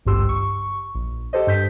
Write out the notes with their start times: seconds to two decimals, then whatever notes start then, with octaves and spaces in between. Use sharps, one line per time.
0.05 G#1 C#2 G2 G4 C6 E6
0.29 C#6
0.95 A#1
1.33 G4 A4 C5 D#5
1.47 G2 G6 B6